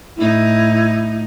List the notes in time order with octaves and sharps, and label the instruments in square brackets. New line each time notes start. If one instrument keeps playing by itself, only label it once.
[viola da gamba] A2 D#4 [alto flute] E4